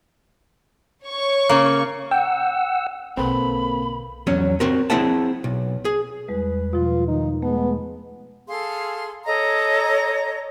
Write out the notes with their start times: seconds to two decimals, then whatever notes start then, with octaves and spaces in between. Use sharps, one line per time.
1.06 C#5 C#6
1.49 C#3 A#3
2.11 F#5 G5 E6
3.17 B1 D3 A#3 C4 A4 B4 B5
4.27 E2 F#3 C#4
4.60 C4 F#4 A#4
4.90 C4 E4 G#4 E5 F#5 A5
5.44 B1
5.85 G#4
6.28 E2 G3 G#3 B4
6.73 B2 F3 F4
7.08 D#3 D#4
7.43 G#3 A3 B3
8.48 G#4 A4 F5 C6
9.25 A4 C#5 D#5 A#5